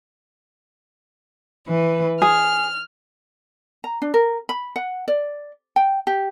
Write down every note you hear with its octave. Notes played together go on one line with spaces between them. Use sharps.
E3 B4
G#4 F6
A#5
D4
A#4
B5
F#5
D5
G5
G4